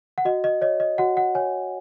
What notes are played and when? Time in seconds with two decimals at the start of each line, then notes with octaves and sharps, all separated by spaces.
0.18 F#5
0.25 F#4 D#5
0.44 D#5
0.61 C#5 D#5
0.80 D#5
0.98 F#4 F#5
1.17 F#5
1.35 C#5 G#5